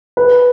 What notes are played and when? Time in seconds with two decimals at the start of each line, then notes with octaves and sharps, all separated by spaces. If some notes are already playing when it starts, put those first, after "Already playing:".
0.17 B4